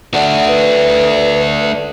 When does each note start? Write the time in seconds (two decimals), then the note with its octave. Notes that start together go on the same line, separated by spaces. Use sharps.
0.14 A3 D4 F#5
0.48 B4